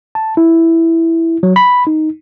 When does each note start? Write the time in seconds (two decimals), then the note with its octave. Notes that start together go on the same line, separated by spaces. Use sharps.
0.15 A5
0.37 E4
1.43 F#3
1.56 B5
1.87 D#4